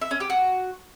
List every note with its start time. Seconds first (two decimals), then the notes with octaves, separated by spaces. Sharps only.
0.01 E5
0.11 C#4
0.20 G4
0.30 F#4